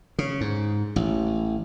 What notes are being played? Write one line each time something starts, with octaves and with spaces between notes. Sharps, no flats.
C#3
G#2
A1